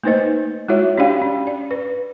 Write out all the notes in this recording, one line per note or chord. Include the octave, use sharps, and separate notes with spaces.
A3 A#3 D#4 B4 C5 D#5
G#3 E4 F#4 C#5 E5
C#4 D4 G4 D5 F5 G5
C#4
D5
B4